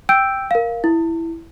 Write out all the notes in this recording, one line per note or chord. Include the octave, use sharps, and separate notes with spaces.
G5 E6 G6 D7
A#4 F5
E4